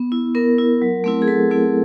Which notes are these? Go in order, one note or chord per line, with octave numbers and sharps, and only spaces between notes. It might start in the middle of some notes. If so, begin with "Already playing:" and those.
Already playing: B3
E4
B3 A#4
E4
F#3
A3 C4 E4
G#4
F#3 A4
A3 C4 E4